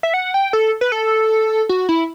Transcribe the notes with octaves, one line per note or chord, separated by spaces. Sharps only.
E5
F#5
G5
A4
B4
A4
F#4
E4